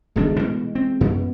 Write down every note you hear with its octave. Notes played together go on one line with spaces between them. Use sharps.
D1 B1 E3 G#3 A3 D4
B2
C4
F#2 B2 B3